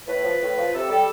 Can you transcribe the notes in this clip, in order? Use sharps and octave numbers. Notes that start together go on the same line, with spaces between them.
A2 B4
F3
A2
F3
C3 A4
G3 A4